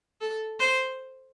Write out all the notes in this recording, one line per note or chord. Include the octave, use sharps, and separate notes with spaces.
A4
C5